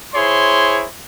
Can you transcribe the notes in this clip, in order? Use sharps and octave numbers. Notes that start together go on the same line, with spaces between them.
E4 G#4 C5 C#5 C6